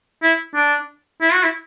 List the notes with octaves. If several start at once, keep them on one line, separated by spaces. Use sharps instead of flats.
E4
D4
E4
F#4
E4